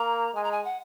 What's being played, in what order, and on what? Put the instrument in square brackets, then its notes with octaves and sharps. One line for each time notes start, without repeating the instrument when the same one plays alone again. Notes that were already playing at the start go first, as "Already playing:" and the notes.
Already playing: [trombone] A#3 [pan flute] A#5
[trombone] G#3 [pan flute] G#5
[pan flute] A#5
G#5
F#5